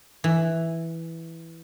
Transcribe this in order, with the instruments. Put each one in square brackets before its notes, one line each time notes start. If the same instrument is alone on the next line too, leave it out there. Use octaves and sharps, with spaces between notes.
[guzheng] E3